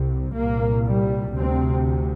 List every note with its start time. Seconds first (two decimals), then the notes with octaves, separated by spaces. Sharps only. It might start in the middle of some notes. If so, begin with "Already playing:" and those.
Already playing: C2 C3
0.35 C2 A#2 A#3
0.86 G3
1.36 D2 C3 C4